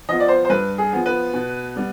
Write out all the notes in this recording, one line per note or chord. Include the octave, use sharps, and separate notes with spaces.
F3 B3 D#5
D5
C5
C5
G2 B4
G#4
F3 B3
B4
B2
G3 B3